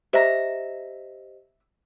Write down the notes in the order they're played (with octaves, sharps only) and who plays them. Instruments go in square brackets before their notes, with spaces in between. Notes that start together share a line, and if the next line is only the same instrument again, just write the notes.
[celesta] G4 C5 D#5 [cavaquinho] E5 A#5